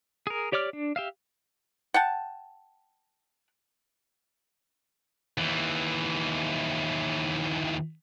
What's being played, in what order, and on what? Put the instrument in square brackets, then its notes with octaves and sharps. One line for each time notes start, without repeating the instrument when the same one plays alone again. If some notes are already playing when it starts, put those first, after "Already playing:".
[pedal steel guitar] G#4 A#4
G4 C#5 D5 D6 F6
D4
G4 E5 F5
[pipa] F#5 G5 A5
[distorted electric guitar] D#2 E3